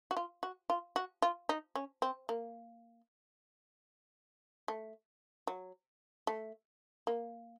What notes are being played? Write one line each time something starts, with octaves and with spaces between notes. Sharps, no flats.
F#4
F4
F#4
F4
F#4
F4
D#4
C#4
C4
A#3
A3
F#3
A3
A#3